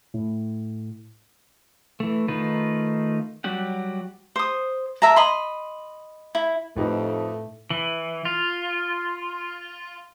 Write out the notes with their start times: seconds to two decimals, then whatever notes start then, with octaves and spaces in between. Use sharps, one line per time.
0.14 A2
2.00 E3 A3
2.28 D#3 A3 D#4 F4 B4
3.44 F#3 G3 F#4 G4 F#5
4.36 C5 D#6
5.02 A#4 E5 A5 A#5
5.16 D#5 B5 C6
6.35 E4
6.77 F2 A2 A3 D#4 G4 B4
7.70 E3
8.25 F4